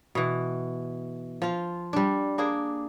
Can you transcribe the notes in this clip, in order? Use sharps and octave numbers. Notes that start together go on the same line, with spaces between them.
B2 E3
F3 F4
G3 D4
A#3 D4 G#4